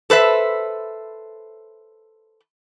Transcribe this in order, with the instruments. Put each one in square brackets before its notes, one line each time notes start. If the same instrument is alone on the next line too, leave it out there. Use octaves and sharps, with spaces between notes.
[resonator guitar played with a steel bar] A4 B4 C5 E5